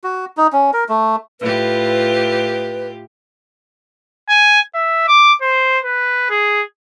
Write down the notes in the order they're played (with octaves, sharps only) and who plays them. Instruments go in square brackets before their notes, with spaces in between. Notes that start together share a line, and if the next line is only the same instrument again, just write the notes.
[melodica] F#4
D#4
C#4
A#4
A3
[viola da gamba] A2 F4 G4 [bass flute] B4
[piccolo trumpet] G#5
E5
D6
C5
B4
G#4